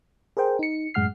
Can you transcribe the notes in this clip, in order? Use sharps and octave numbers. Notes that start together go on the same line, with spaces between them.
G#4 A#4 C5 G5
D#4 C#7
F#2 A2 G#3 F#5 F6 C7